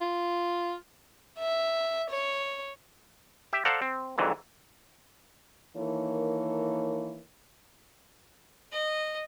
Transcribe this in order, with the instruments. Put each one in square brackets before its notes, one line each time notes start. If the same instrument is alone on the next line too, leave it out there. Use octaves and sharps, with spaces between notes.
[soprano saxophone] F4
[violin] E5
C#5
[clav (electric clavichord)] G4 E5
A4 C5 D5 F5 F#5 A#5
C4
F2 G#2 D3 E3 F#3
[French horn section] D#3 E3 A#3 A4 A#4 C#5
[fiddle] D#5